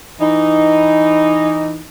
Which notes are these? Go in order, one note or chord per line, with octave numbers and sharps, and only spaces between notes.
E3 D#4